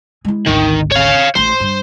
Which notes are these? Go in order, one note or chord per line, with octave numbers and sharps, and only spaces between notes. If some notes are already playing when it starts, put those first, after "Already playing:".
G#3 E4
G#1 D2 D#3
C#5 F5
A1 A3 C5
G2